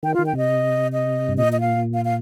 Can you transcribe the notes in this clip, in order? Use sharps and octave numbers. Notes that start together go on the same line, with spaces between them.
D#3 G5
D#3 F4
G5
C3 D#5
D#5
G2
A#2 D#5
D#5
F5
F5
F5